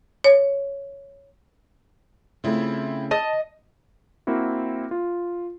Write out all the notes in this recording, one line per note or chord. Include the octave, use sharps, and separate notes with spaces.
C#5
C#3 A3 C4 E4 F4
D#5 A5
A#3 C4 E4 F#4
F4